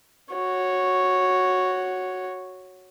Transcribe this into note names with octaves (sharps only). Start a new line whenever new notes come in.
F#4 C#5